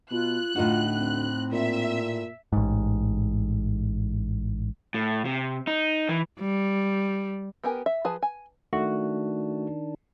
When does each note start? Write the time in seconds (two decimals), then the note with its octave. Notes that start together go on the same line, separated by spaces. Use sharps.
0.11 B2 F4 F#6
0.55 D2 A2 D#4 F4 F#4
0.97 C4
1.52 A#2 E5
2.53 A1 G#2
4.94 A2
5.25 C3
5.67 D#4
6.09 E3
6.40 G3
7.64 B3 G4 A#4 G#5
7.86 E5
8.05 F3 G#4 B4 A5
8.22 G#5
8.73 D#3 A3 D4 F#4